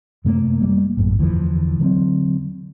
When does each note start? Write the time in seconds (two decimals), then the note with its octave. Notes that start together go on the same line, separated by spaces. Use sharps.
0.25 F#2 C3 A3 A#3
0.62 G3 A3 A#3
0.97 A1 F#2 A2
1.19 E2 D3 E3 F3
1.80 D3 F#3 B3 C4